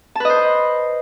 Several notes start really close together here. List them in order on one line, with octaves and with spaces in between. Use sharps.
A5 B4 D#5 C5